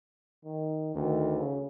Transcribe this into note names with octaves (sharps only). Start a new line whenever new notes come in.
D#3
D2 D#3
C#3